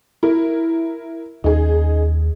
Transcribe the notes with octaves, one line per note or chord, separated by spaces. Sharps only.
E4 A#4
D#2 C#4 D#4 G#4